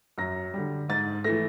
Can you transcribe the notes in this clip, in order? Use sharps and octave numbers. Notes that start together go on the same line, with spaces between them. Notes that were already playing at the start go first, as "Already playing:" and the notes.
F#2 A#6
D3 G3
G#2 A6
E3 A3 A#6